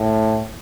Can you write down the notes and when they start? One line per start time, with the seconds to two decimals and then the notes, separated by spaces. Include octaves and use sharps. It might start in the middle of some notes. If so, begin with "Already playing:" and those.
Already playing: A2